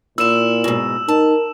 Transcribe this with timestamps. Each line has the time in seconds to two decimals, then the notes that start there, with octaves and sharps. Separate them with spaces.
0.18 A#2 E4 F4 E6 E7
0.64 G#2 B2
1.08 D#4 A#4 A5